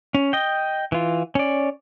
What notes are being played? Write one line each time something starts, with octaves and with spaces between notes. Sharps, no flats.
C#4
D#5 G5
E3 F4
C#4 D5